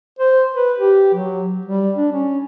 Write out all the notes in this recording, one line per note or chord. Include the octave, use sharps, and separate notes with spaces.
C5
B4
G4
F#3
G3
D4
C#4